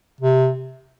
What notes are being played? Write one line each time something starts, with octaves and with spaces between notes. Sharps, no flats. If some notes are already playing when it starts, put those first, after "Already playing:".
C3